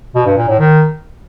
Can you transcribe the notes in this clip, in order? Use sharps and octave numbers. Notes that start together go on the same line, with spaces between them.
B2
G2
A#2
A2
D#3